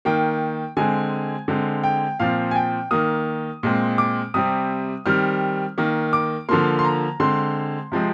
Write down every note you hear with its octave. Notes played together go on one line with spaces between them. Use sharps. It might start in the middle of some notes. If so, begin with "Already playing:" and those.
D#3 A#3 G5
D3 G#3 C4 G#5
D3 G#3 C4
G5
A#2 F3 C4 F5
G#5
G5
D#3 A#3 D#6
A#2 G#3 C4
D6
C3 G3 C4 D#6
D#3 G3 C4 F6
D#3 A#3
D6
D3 F3 A#3 C6
C6
A#5
D3 G#3 C4 C6
C3 F3 G#3 C4